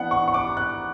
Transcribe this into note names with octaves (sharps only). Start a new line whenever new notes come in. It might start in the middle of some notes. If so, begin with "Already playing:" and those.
Already playing: E3 B3 D4 F#5
C#6
C#6
D6
F#6